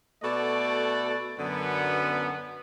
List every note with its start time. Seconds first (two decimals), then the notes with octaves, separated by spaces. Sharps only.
0.23 B2 A3 F#4 A4 D5
1.38 F#2 D3 B3